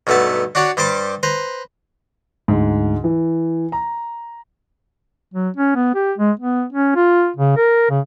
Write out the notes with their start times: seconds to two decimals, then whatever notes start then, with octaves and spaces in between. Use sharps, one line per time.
0.07 B1 G2 A3 B3 A5
0.55 D4 F#4 C#5 D5
0.77 G2 G3 C5 A5 D6
1.23 B4 C5 A#5
2.48 D2 G#2
3.04 E3
3.72 A#5
5.34 F#3
5.57 C#4
5.75 B3
5.95 G4
6.18 G#3
6.39 B3
6.73 C#4
6.95 F4
7.36 C#3
7.57 A#4
7.90 C#3